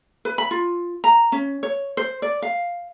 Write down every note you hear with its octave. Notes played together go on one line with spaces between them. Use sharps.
B4
B5
F4
A#5
C#4
C#5
C5
D5
F5